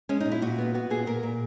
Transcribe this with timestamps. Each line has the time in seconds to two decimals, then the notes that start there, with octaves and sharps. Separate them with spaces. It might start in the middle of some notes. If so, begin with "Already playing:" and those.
0.09 G#3 C#4
0.20 D#4
0.26 A#2
0.32 E4
0.42 A#2 F#4
0.58 B3
0.74 B3 F#4
0.90 A#2 G#4
1.06 A#2 A#4
1.23 A#2